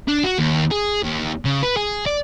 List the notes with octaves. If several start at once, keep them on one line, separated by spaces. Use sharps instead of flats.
D4
F#4
D#2
G#4
D#2
C#3
B4
G#4
D5